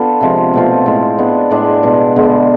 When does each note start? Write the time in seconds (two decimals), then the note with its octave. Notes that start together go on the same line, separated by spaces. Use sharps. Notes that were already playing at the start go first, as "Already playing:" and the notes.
Already playing: B3 D4 F4 A4
0.21 C3 F3 G#3
0.53 B2 A3 C4 F4
0.86 A2 G#3 C4
1.18 G#3 B3 D4
1.51 A2 G#3 D4
1.83 B2 G#3 D4
2.16 D3 G#3 B3